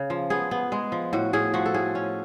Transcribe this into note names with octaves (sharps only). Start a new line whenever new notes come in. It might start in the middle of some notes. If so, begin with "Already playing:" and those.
Already playing: C#3
F3
B3 G#4
B3
G#3
F3
A2 F#4
A2 G#4
F3 F#4
A4
A2 G#4
C#4